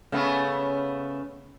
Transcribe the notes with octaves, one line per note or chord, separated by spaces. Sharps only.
C#3 A3 B3